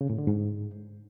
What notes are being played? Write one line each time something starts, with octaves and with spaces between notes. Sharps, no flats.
C#3
A2
D3
G#2